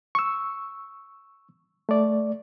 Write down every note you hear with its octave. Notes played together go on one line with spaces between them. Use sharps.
C#6 E6
A3 D5